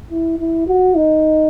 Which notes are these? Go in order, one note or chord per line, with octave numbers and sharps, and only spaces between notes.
E4
E4
F#4
D#4